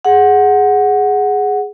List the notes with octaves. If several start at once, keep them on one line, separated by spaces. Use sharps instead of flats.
G#4 F#5